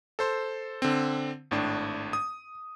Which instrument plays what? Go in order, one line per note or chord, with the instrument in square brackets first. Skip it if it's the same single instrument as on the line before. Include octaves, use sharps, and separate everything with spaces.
[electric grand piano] A4 C5 C6
D3 C4
G#1 A2 D4
D#6